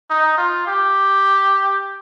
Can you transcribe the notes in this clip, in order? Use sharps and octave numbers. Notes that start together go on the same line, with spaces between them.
D#4
F4
G4